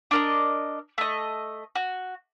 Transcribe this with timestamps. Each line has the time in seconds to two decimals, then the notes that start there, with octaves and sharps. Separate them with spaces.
0.11 D4 A#4 D#5
0.98 A3 D#5
1.75 F#4